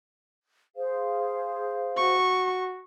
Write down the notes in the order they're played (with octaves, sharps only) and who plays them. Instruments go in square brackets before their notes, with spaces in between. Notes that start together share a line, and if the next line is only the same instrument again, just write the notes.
[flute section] G#4 C5 F5
[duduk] F#4 [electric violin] C#6